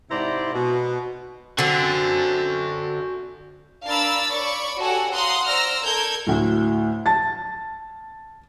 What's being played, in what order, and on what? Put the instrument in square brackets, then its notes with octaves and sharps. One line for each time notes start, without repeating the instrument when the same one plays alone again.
[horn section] G#2 C3 E4 C5 D5 A#5
B2
[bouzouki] D3 C4 [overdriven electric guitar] F#4 G#5
[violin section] D4 A#4 F5 B5 E6 A6
C#5 D5 B5 C#6
F#4 G4 A4 C#5 F#5 G#5
F5 F#5 A#5 C6 D#6
C5 D5 A#5 E6 F6 A#6
A4 A#4 G6 G#6
[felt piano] D2 A2
A5 A6